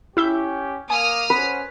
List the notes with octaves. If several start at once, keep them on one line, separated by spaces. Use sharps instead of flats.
C#4 E4 G4 E5 C#6 G6
A#3 G#5 D#6 F6
C#4 B4 C5 F#5